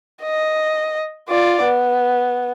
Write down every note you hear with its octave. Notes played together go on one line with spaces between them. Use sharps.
D#5
F4 D5
B3